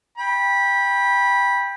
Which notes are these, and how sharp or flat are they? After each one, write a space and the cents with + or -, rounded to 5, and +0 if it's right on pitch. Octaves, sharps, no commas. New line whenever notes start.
G5 +15 B5 -20